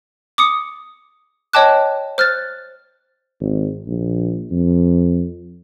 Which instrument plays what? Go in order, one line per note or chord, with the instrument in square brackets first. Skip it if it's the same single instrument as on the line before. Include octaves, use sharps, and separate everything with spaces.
[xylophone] D6 D#6 C#7
C#5 D#5 G5 A5 D6 F#6
C5 F6 F#6 A6
[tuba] G#1
A#1
F2